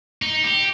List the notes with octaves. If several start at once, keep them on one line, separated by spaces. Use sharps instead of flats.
D#4
G4